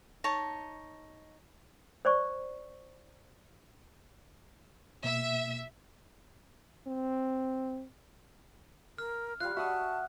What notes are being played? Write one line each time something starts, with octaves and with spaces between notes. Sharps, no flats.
D#4 C#5 A5
C5 D5 C#6
B2 A#3 E5
C4
A#4 F6
G3 F4 F5 F#6
F#4 E5 F#5 A5 D#6